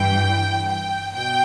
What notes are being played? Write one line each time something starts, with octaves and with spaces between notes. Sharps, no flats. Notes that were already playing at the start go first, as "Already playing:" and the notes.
Already playing: G2 E3 G5
G5
B2 G5